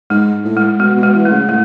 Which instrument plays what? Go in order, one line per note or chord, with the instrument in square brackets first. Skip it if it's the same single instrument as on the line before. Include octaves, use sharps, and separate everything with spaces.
[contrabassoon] G#2 [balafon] G#3
[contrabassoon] A2
[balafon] G#3
[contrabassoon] B2 [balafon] G#3
[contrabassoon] B2
[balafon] G#3
[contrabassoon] E3
[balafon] A3
[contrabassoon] C#3
[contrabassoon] A2 [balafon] A3